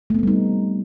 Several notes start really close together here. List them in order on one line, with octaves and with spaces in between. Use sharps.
A3 B3 C4 G3 D#4